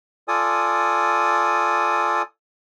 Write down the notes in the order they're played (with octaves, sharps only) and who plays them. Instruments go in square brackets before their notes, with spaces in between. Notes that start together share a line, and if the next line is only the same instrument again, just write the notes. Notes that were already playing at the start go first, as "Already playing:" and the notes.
[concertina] F4 A4 D5 G#5 D#6